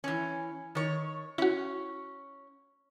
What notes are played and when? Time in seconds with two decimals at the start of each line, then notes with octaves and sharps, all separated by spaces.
0.04 E3 C#4
0.75 D#3 C#5
1.38 C#4 E4 F#4